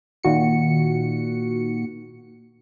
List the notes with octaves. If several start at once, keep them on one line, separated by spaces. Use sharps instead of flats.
A#2 D#3 F#4 C#7